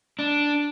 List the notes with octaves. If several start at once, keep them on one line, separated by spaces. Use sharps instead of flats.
D4